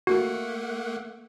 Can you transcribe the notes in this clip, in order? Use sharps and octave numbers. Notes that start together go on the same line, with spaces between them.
A3 A#3 F#4 F#5